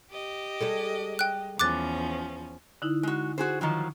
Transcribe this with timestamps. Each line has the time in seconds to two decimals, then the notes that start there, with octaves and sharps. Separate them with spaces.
0.11 G4 D#5
0.61 G3 G#3 A4
1.19 G5 F#6
1.59 E2 F3 C#4 D6 F#6 A6
2.82 D3 D#4 E4
3.03 G#3 F#4
3.38 F#4 G#4 C5
3.61 D#3 F3 F#3